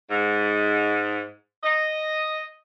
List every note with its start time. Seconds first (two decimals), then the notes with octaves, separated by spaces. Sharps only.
0.10 G#2
1.62 D#5